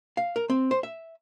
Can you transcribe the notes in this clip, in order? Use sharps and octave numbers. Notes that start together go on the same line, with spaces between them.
F5
A#4
C4
C5
E5